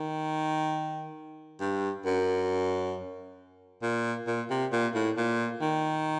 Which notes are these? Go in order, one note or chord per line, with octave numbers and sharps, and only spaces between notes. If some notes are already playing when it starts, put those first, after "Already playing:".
Already playing: D#3
G2
F#2
A#2
A#2
C3
A#2
A2
A#2
D#3